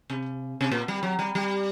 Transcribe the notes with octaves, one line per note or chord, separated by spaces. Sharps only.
C3
C3
A#2
G3
F#3
G3
G3